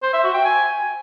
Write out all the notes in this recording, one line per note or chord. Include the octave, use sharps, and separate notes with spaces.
C5
E5
F#4
G5
G#5